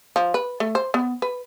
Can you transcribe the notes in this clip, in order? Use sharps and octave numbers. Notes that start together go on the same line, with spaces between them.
F3
B4
A3
C5
B3
B4